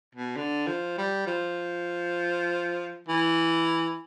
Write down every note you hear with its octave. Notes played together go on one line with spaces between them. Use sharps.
B2
D3
F3
G3
F3
E3